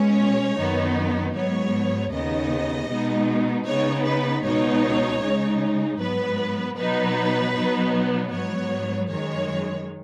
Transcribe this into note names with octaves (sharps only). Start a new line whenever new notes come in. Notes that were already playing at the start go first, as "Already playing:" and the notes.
Already playing: B2 G#3 C#4 C#5
F#2 D#3 B3 D#4
G#2 F#3 B3 C#5
D#2 C#3 B3 D#4 D#5
B2 G#3 B3 D#4
C#3 B3 D#4 C#5
B4
C#2 B2 B3 D#4 C#5
C#3 G#3 D#4
G#2 F#3 B3 B4
B2 F#3 B3 D#4 B4
B2 F#3 B3 D#4
G#2 F#3 B3 C#5
F#2 D#3 G#3 C#5